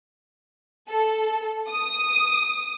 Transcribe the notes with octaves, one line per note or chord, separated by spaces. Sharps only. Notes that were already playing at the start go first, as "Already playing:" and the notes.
A4
D#6